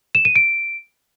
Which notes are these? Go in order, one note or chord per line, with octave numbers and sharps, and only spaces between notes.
E7
D#7
D7